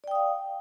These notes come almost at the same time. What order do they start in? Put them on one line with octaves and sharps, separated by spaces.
D5 G5 D#6 F5